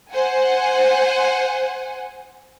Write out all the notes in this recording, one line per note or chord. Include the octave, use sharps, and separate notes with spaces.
C5 F#5 G#5